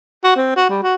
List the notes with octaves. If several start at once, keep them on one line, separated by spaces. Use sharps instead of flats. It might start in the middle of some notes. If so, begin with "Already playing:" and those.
F#4
C4
F#4
G3
F#4